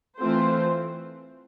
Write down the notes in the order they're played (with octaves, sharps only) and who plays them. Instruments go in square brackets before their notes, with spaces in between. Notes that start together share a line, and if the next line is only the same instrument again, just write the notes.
[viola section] E3 A3 C4 F4 C5